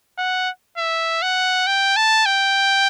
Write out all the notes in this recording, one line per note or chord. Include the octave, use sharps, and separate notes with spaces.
F#5
E5
F#5
G5
A5
G5